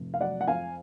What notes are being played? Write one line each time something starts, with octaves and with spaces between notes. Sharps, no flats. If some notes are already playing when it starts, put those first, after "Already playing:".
Already playing: F1
F5
F#3 D5 F#5
F#5
F2 F5 G#5